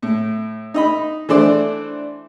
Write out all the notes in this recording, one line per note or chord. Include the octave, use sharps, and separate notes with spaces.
A2
D#4 D#5 B5
E3 A3 D4 C5 D5